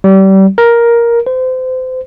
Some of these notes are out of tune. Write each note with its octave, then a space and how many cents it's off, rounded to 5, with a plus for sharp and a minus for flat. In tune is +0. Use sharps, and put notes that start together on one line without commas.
G3 -30
A#4 +10
C5 -30